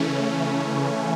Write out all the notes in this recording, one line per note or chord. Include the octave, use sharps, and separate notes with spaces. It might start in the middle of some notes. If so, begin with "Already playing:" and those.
Already playing: C#3 E3 A3 C#4